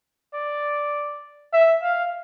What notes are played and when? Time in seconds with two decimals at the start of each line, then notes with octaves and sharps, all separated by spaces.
0.34 D5
1.53 E5
1.83 F5